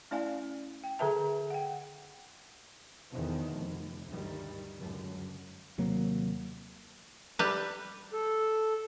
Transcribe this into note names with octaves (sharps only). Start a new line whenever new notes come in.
A3 C#4 E4 D5 F5 G#5
G5
D3 G#4 A4 B4 E5 A5
F#5 G5
E2 B2 D3 D#3 F3
F1
D2 G2 D#3 G3
C#2 F#2 D3
D#2 C3 F#3 A#3
G3 B4
A4